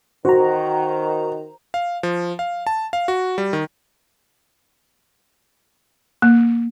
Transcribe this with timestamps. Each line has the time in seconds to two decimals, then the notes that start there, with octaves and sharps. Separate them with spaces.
0.25 D#3 F#4 C5 A#5
1.74 F5
2.03 F3
2.39 F5
2.67 A5
2.93 F5
3.08 F#4
3.38 G3
3.53 D#3
6.22 A#3